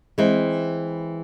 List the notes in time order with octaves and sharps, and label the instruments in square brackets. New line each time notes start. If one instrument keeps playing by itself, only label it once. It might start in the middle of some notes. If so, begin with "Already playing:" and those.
[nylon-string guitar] E3 G#3 C4